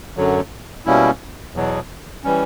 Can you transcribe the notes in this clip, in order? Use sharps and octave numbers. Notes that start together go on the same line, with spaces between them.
F#2 D3 F#3
B2 G3 A#3 C#4 E4
E2 B2 F#3
E3 G3 C#4